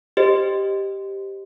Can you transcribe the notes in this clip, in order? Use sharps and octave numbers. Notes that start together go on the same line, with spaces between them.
G4 C5 D#5